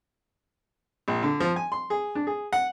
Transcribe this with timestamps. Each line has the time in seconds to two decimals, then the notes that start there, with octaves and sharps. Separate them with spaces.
1.08 A#1
1.22 D3
1.40 F3
1.56 G#5
1.72 C6
1.90 G#4
2.15 D4
2.27 G#4
2.53 F#5